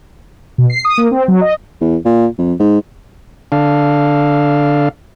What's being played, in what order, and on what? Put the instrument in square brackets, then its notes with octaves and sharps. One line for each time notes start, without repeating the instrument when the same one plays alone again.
[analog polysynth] B2
C7
D#6
A#3
C4
F#3
D#5
[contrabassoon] E2
A#2
F2
G#2
[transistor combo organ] D3 D4 A4 F5